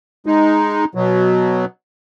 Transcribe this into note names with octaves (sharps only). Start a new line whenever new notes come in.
G#3 D#4
B2 F#3